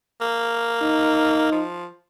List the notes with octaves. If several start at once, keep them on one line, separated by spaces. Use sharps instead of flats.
A#3
D#4
F3